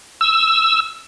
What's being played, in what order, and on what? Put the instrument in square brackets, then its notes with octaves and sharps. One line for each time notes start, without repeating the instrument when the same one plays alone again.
[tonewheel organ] E6